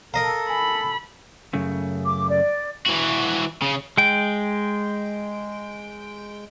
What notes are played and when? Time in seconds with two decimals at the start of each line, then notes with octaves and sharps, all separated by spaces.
0.14 A4 A#4 D#5 F5 A#5
0.49 G#5 B5
1.53 F#2 C#3 A3
2.06 D6
2.29 D5
2.86 E3 F#4
3.62 C#3
3.97 G#3 G5